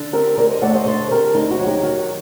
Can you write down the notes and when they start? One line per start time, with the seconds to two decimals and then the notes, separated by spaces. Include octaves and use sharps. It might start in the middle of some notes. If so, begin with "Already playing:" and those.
Already playing: D3
0.13 C4 G4 A#4
0.38 D2 A#4 D5
0.49 C5 D#5
0.62 A3 D5 F#5
0.73 C5 D#5
0.86 D3 A4 C5
1.11 C4 G4 A#4
1.35 D2 D#4
1.51 F#4
1.60 F#3
1.67 D#4 G4
1.83 D#3 F#4